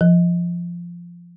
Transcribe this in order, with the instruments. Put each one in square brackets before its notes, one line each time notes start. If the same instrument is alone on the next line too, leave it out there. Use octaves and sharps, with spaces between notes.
[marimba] F3